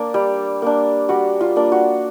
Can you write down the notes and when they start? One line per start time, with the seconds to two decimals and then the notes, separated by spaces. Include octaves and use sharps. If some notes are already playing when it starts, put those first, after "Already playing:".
Already playing: A#3 D4
0.14 G3
0.62 A#3 D4
1.09 G3 F#4
1.41 F4
1.56 A#3 D4
1.72 F#4